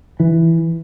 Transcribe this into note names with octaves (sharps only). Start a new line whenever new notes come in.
E3